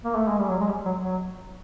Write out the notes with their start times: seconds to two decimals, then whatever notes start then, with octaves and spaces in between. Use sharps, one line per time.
0.04 A#3
0.15 A3
0.28 G#3
0.39 G3
0.49 F#3
0.60 G#3
0.68 G3
0.85 F#3
1.04 F#3